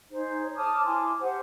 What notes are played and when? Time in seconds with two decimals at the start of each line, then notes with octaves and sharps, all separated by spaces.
0.10 D#4 G#4 C5
0.44 C#5
0.56 A5 D6 D#6 F6
0.85 E4 G#5 C6 D6
1.20 G4 C5 F#5